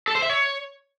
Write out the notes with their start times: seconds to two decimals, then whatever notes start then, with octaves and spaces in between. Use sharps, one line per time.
0.08 A4
0.15 C5
0.22 E5
0.30 C#5